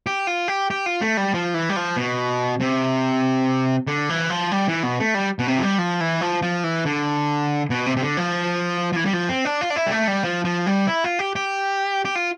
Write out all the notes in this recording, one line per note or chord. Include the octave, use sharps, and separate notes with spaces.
G4
F4
G4
G4
F4
A3
G3
F3
E3
G3
F3
B2
C3
D3
E3
F3
G3
E3
B2
A3
G3
B2
C3
F3
G3
F3
E3
F3
F3
E3
D3
B2
C3
C3
D3
F3
F3
E3
G3
F3
C4
D4
F4
D4
E4
G3
A3
G3
F3
F3
G3
E4
F4
G4
G4
G4
F4